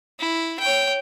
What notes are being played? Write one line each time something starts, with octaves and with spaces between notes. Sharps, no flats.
E4
C#5 G5